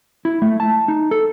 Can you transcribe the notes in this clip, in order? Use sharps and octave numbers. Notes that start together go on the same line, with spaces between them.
E4
A3
A5
D#4
A4